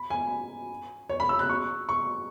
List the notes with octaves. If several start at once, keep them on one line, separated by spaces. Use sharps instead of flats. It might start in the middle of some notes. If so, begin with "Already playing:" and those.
Already playing: B5
G#5
C#5
B5
E6
F#6
C#6
C#6